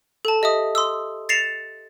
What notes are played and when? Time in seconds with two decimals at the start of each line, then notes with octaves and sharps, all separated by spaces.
0.25 A4 A5
0.42 G4 D#5 E5 D#6
0.75 C6 D#6 E6
1.29 A6 A#6 C7 C#7 E7 F7